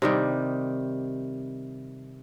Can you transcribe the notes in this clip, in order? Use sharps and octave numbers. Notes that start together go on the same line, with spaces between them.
C3 D#3 G3